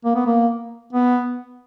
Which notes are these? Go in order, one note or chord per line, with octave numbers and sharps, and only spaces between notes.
A#3
B3
A#3
B3